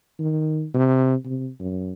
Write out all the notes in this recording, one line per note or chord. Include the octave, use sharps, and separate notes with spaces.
D#3
C3
C3
F#2